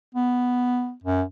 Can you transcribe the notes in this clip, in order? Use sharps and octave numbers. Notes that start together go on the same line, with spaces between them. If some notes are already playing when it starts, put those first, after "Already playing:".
B3
F#2